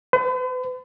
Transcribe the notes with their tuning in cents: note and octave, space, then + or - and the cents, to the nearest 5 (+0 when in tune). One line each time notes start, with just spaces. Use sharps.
B4 +45